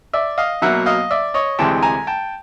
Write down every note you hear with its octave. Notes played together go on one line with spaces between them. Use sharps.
D5 E5
D#5 F5
B2 F#3 A#3 E5 F#5
D#5 F5
D5 E5
C#5 D#5
D2 C3 E3 G#3 G5 A5
G#5 A#5
G5 A5